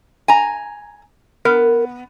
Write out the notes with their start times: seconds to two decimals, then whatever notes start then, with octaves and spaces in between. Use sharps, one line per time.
0.28 G#5 A#5
1.45 B3 A#4